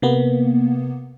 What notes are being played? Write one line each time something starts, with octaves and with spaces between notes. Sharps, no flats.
C3 A#3 B3